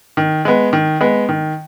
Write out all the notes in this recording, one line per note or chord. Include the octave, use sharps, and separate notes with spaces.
D#3
G#3 B3
D#3
G#3 B3
D#3